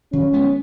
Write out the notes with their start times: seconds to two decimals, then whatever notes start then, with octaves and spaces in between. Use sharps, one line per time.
0.13 D#3 F#3 C#4
0.33 G#3 B3